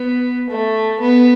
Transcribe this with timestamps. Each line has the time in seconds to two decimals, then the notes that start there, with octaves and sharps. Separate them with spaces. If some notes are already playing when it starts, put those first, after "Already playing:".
Already playing: B3
0.50 A3
1.00 B3